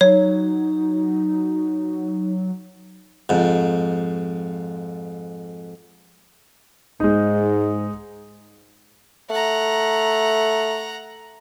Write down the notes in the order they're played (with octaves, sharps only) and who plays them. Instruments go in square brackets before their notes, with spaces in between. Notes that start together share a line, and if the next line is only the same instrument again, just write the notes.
[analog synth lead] F#3 [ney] D#4 [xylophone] C#5
[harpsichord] F2 G#2
[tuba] G#2 [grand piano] G#3 D#4
[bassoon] A3 [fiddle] F#5 A#5